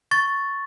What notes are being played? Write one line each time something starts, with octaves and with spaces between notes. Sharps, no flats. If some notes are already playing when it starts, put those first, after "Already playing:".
C#6 A6